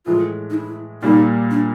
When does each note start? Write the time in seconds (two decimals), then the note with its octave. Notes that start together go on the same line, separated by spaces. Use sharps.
0.06 A2 E3 G#3 F4
0.50 D#4
0.54 E4
1.02 A#2 G3 A#3 D#4
1.51 D4